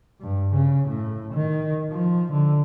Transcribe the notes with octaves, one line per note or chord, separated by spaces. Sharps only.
G2
C#3
A2
D#3
F3
D3